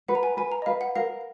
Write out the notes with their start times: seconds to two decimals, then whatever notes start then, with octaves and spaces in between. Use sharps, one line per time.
0.08 B4 F#5
0.15 A#5
0.23 G#5
0.37 B4 G#5
0.52 A#5
0.62 D#5
0.66 B4 F5
0.81 F#5
0.96 A#4 F5